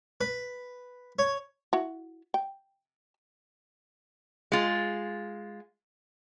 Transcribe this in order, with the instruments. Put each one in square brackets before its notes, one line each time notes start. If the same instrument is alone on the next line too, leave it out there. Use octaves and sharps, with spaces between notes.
[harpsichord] B4
C#5
[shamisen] E4 F#4
G5
[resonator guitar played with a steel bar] G#3 F4